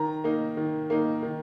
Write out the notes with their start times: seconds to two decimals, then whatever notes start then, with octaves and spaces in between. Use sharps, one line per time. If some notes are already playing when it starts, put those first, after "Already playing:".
Already playing: D#3 A#5
0.24 A#3 D#4
0.57 D#3
0.90 A#3 D#4
1.23 D#3